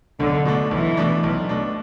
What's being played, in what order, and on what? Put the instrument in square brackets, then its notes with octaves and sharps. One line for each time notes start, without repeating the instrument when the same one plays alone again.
[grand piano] B1 [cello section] D3
[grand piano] B2 A3 D4
[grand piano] B1 [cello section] E3
[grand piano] B2 A3 D4
B1
B2 A3 D4